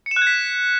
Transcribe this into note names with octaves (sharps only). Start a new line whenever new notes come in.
C#7
E7
F#6
G#6
B6